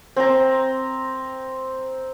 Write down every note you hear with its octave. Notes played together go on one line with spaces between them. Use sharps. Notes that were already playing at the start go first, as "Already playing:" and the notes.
C4 A#5